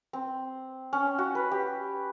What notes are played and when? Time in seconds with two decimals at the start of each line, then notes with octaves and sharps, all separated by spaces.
0.13 C4
0.93 C#4
1.18 F#4
1.35 B4
1.51 G4